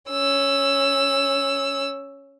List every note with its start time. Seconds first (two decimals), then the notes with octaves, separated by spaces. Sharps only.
0.11 C#4 E6